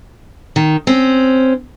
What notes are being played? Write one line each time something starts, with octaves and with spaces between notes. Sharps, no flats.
D#3
C4 C#4